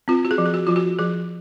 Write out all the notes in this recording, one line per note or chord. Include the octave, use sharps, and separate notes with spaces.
C4 F4
F#4
G#4
F3
G#4
F#4
F3 F4
F#4
F3 G#4